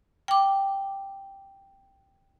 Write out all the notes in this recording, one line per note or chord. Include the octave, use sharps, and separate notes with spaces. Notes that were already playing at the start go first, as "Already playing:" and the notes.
G5 D6